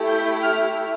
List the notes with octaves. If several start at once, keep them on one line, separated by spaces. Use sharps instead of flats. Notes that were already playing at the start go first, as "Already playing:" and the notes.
Already playing: A3 E4 G4
G6
F6